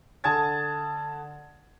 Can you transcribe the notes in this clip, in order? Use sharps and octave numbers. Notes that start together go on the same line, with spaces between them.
D3 A5 D#6 G#6 A6